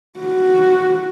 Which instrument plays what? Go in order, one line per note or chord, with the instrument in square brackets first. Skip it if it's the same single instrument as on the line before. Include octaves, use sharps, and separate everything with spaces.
[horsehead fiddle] F#4